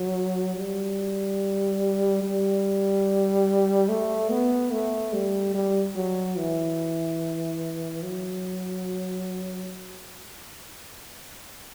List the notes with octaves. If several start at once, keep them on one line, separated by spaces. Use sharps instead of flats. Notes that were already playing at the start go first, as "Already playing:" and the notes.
Already playing: F#3
G3
G3
A3
B3
A3
G3
G3
F#3
E3
F#3